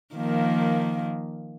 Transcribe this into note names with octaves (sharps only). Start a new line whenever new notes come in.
D#3 F3 A#3